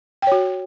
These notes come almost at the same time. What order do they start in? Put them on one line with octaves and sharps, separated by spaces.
G5 C#5 F#4